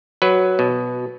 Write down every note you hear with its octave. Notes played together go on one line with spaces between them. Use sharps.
F#3 B4
B2